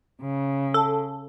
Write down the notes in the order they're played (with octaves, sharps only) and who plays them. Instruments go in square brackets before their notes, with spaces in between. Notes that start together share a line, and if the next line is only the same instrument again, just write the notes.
[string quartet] C#3
[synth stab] A4